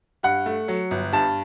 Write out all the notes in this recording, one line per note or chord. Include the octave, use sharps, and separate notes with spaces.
G2 F#5
A3
F#3
G1
G2 A5